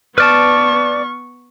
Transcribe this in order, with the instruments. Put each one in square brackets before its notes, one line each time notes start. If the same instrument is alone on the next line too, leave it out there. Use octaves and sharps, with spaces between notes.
[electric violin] B3 C#6 [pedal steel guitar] B4 D5 A5 [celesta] F6